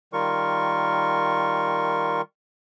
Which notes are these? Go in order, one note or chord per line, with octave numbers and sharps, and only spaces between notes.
D#3 G3 F4 A#4 C#6